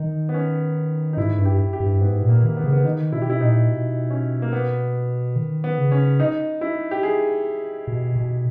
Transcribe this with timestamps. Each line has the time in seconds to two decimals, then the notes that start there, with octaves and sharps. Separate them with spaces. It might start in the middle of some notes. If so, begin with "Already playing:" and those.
Already playing: D#3 D#4
0.29 B3
0.34 C#4
1.13 D#4
1.17 G#2 E4
1.39 G2
1.45 G4
1.73 G4
1.80 G2
2.01 G#2 B3
2.22 A#2
2.29 A#3
2.43 D#3 A#3
2.57 B3
2.64 C#3 A#3
2.73 B3
2.84 D#3 D#4
3.12 B2 E4
3.22 G4
3.30 E4
3.41 A#2 D#4
3.68 B2
4.10 C#4
4.42 A#3
4.52 B3
5.36 D#3
5.64 B3
5.78 C#3
5.92 C#4
6.20 D#4
6.61 E4
6.91 G4
7.03 G#4
7.87 B2
8.15 B2